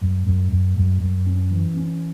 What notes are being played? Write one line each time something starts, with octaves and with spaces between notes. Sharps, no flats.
F#2
F#2
F#2
F#2
F#2
C#4
E3
C#4